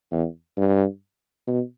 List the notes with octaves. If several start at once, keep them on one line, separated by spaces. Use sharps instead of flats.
E2
G2
B2